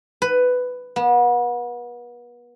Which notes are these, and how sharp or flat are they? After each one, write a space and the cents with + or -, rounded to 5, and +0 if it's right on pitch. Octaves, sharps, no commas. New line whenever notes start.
B4 +10
B3 -35